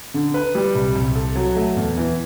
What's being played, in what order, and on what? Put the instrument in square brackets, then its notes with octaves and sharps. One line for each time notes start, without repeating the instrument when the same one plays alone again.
[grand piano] D3
B4
G3
C2
C2
A4
F#3
A3
E2
E3